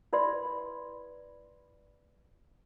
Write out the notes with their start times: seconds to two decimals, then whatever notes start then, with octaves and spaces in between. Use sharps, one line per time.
0.13 E4 B4 D5 E5 B5 C6